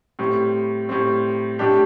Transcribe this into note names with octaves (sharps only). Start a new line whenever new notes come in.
A2 G3 C4
A2 G3 C4
A2 G3 D4 G4